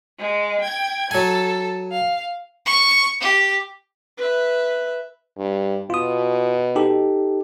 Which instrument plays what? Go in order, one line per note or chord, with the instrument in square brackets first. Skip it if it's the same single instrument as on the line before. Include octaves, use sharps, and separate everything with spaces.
[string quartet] G#3
G5 G#6
[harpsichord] F#3 G#5 [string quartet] A4
[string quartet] F5
[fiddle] C#6
G4
[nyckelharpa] B4 E5
[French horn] G2
[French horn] B2 [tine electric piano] F4 D#6
[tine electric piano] D#4 G4 A4